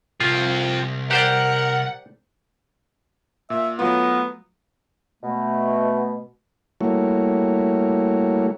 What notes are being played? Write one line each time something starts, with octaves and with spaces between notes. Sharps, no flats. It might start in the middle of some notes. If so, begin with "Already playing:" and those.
C2 F3 C4 F4
G4 A#4 C5 D5 F#5
A#2 E5
F#3 A3 B3 F4
B2 A3
G3 A3 A#3 E4 F#4 C#5